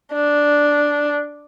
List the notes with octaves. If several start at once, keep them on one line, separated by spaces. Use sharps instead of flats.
D4